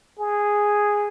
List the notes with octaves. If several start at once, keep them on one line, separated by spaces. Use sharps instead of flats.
G#4